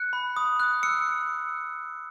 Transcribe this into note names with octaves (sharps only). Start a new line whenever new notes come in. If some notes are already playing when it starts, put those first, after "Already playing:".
Already playing: F#6 C#7
B5
D#6
F#6
E6 C#7